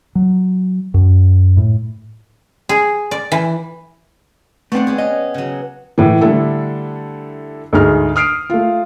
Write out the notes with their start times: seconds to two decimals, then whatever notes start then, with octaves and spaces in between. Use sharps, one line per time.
0.15 F#3
0.94 F#2
1.57 A2
2.69 G#4
3.11 D5
3.32 E3
4.72 A3 B3 C4 D5 F#5
4.87 G4 G#4
4.98 C#4 D#5
5.34 C#3 F#3
5.98 A2 E3
6.21 D3 G3 A3 D4 E4 A4
7.73 D2 G#2 G#4 A#5 F6
8.16 D#6 F6 C7 D7
8.50 A3 F4